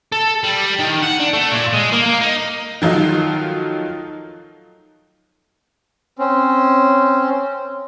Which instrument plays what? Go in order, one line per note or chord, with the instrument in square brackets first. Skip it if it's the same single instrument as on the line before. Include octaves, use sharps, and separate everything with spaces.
[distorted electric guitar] A4
G3
D#3
F#5
D4
A3
A#2
G#3
A#3
A#3
D#4
[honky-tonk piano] D#3 F3 F#3 A3 D#4 F4
[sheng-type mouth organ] C4 C#4